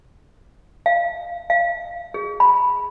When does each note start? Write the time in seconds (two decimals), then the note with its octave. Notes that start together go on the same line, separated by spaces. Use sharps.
0.86 F5
1.50 F5
2.14 G#4
2.40 B5